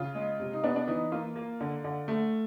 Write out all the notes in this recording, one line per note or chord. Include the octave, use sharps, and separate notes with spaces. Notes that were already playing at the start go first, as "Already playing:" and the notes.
Already playing: C#3 F4
G#3
C3
D#4
B3 D4
D4
E3 D#4
A#3 F4
A#3
D3
D3
A3